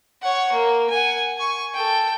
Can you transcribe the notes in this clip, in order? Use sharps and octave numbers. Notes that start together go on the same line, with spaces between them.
C#5 F#5
A#3
F#5 G#5
G#5 C#6
A4 G5